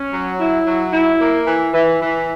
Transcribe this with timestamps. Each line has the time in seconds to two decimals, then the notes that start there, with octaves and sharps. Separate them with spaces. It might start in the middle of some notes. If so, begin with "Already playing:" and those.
Already playing: C#4
0.13 F#3
0.39 E4
0.66 F#3
0.93 E4
1.20 A#3
1.46 E3
1.73 E3
2.01 E3